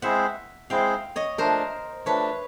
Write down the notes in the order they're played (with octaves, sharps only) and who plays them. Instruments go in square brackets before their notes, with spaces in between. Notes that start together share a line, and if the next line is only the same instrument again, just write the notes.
[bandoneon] G#3 C4 E4 G#4 C5 [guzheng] E5 F#5
[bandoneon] G#3 C4 E4 G#4 C5 [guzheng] F5 G5
[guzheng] C#5 D#5
[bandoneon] F3 A3 D4 [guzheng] A#4 C5
[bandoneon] F3 A3 D4 [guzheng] B4 C#5